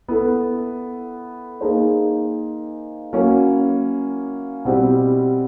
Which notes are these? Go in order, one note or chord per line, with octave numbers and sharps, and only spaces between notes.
B3 E4 A4
A#3 D#4 G#4 C5
F#3 A#3 C#4 E4
B2 G3 C4 E4 G4